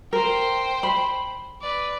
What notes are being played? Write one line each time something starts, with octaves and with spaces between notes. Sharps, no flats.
A#4 C5 G5
B5
B4 D5